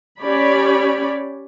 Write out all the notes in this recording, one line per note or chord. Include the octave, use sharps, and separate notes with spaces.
C#4 G4 C#5 D5 B5